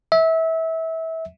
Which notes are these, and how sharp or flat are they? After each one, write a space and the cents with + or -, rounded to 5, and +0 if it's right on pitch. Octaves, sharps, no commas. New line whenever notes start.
E5 -25